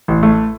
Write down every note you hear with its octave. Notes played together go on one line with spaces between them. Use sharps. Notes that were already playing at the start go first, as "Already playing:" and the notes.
A1
A3